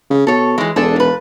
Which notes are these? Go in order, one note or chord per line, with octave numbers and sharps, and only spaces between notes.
C#3
B2 A4 C#5
E3 G#3
E1 D4 G#4 A4
A#2 B4